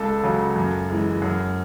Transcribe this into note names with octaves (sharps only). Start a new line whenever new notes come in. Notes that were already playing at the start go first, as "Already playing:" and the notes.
Already playing: C#2 A4
C#3 F#3
F#2
E3 G#3
F#2